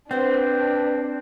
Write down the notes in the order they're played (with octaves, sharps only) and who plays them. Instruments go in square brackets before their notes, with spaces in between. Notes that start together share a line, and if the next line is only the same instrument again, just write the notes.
[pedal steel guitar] C4 [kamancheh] D4 [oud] F#4 C5 [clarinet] B4